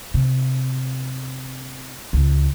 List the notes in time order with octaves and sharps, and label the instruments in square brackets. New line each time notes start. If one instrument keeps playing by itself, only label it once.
[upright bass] C3
C#2